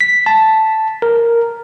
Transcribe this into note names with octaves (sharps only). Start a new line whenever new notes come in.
B6
A5
A#4